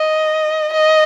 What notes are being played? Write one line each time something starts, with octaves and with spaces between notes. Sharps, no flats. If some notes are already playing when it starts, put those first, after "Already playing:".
Already playing: D#5
D#5